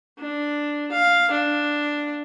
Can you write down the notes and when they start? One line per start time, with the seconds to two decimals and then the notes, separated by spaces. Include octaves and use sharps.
0.19 D4
0.92 F5
1.31 D4